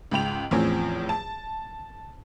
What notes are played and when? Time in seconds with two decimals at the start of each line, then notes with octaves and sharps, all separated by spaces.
0.11 C#2 G#2 G5 F7
0.51 E2 A2 F3 C4 C#4
1.09 A5